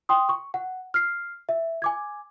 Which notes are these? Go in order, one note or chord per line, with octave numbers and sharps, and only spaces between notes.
G5 C6 D#6
C#6
F#5
F6 C7
E5
G#5 D6 G#6